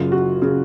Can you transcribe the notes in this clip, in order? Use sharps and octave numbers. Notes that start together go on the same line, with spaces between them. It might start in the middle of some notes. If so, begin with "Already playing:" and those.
Already playing: F#1 F#2 C#3 F4
F#4
C#3